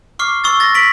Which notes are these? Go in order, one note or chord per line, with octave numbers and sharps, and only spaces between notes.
C#6 D6 F6 C7
C#6 E6 A6
A6 A#6
B6 D7 F#7